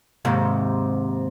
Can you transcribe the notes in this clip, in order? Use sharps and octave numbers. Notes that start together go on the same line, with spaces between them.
D#2 G#2 C3